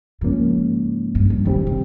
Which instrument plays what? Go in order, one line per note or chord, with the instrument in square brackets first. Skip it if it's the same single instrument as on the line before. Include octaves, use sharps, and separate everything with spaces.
[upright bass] G#2 [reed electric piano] C#3 F3 A#3 C#4
[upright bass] G2
G2
[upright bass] G2 [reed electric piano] D#3 G3 C4 G4
[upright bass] A#2
C3